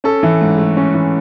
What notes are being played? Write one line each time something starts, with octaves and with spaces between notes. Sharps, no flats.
C#4 A4
E3
G#2
A3
C#4
E3